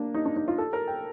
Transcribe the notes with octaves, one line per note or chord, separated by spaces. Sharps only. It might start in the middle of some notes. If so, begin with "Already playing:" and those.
Already playing: A#3 D4
D#4
D4
D#4
F4
A4
A#4
G5